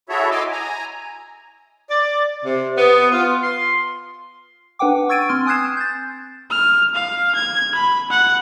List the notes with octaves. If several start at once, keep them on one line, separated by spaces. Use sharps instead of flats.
E4 F#4 G#4 A4 C#5 E5
D#5 G#5 C6 D6 E6
G#5 A#5
D5
C3
B3
F4
C6
D4 B4 F#5 G5 D6
C#6 E6 G#6 A6 D7 D#7
C4 C6 F6
G#5 D#6 F#6 G#6 C7 E7
G6 A6
F6
F5
G#6
B5
F#5